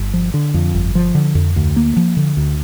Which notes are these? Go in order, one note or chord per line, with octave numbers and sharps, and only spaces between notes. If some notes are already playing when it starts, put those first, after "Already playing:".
Already playing: G1
F3
D3
F2
G1
F3
D3
F2
D2
A#3
F3
D3
D2